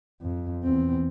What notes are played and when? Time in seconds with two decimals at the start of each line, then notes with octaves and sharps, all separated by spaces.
0.22 F2
0.63 E2 C4